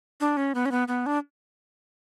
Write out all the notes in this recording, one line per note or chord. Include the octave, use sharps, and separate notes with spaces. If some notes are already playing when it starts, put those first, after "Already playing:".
D4
C#4
B3
C#4
B3
B3
D4